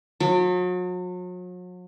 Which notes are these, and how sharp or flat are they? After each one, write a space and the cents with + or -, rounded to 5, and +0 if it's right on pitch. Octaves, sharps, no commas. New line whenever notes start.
F#3 -40